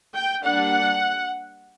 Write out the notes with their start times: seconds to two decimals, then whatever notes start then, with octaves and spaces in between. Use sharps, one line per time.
0.15 G5
0.43 G3 A#3 D4 F#5